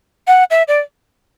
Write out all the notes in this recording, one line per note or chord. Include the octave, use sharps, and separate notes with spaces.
F#5
E5
D5